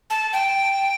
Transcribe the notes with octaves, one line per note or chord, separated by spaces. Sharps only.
A5
G5